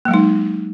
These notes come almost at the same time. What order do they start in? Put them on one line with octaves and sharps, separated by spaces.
A#3 F#3 G#3 D#4